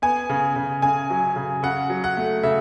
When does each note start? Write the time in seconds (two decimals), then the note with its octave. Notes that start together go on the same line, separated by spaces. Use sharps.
0.02 B3 G#5
0.29 C#3
0.56 C#3
0.82 C#3 G#5
1.10 F#3
1.36 C#3
1.63 C#3 F#5
1.90 F#3
2.04 F#5
2.17 A3
2.43 C#3 E5